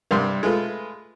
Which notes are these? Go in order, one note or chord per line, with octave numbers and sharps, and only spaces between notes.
G2 C3 G3 C6
G#3 A3 F4 B4